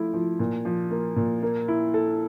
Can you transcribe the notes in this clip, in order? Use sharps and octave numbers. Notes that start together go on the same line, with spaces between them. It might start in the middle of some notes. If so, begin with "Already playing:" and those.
Already playing: F3 A3 E4
F3
A#2
F3
A#3
A#2
A#3
E4
A4